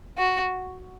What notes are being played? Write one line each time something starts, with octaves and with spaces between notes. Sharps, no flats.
F#4